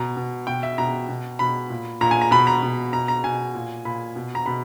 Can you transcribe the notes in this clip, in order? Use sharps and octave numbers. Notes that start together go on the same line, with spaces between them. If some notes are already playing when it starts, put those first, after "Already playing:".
Already playing: B2 A#5
B2
B2 G5
E5
B2 A#5
B2
B2 B5
A#2
A#2 A#5
G#5
A#5
B2 B5
A#5
B2
B2 A#5
A#5
B2 G#5
A#2
A#2 B5
B2
A#5
B2 B5